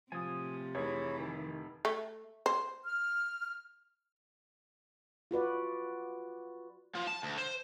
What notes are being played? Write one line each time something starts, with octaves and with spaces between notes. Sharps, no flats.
A2 C3 F3 G#5 D#6
F1 E3 G#4 C#5
D#3
A3
C5
F6
F4 F#4 B4 D5
F3
A5
D2
C5